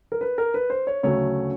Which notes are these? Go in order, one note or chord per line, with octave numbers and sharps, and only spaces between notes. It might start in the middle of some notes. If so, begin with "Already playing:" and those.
A#4
B4
A#4
B4
C5
C#5
D2 C#3 F#3 A3 C#5